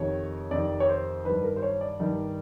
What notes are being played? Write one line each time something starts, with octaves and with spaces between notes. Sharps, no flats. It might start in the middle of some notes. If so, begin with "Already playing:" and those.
Already playing: F2 C3 D#3 C#5
F2 C3 D#3 D5
C#5
C5
G2 D#3 B4
A#4
C5
C#5
D5
G2 D#3